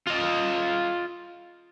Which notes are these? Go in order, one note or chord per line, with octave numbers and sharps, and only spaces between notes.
F4 D#5